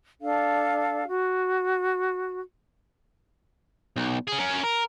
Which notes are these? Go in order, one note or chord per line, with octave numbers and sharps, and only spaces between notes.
D4 A4 F5
F#4
B1
C#4 G#4
C#4 A#4
A#4